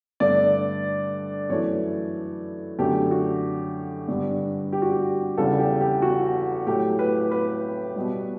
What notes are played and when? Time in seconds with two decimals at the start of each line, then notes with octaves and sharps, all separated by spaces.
0.20 G2 D3 A3 D5
1.50 F#2 E3 A3 C#5
2.79 F#2 D3 A3 G4
3.11 F#4
4.08 G2 D3 G3
4.72 G4
4.82 F#4
4.92 G4
5.37 E2 C#3 E3 G3 A4
5.59 G4
5.81 G4
6.02 F#4
6.67 A2 F#3 A3 G4
6.99 B4
7.31 B4
7.96 B2 G3